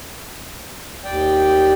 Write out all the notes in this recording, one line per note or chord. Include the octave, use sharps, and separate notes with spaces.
D#2 D5 G5